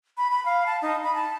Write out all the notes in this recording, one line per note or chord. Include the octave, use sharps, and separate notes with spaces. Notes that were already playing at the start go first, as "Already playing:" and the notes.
B5
B5
F5
A5
D#4
B5
A5